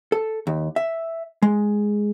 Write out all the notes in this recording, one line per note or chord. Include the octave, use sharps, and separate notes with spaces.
A4
D#2
E5
G#3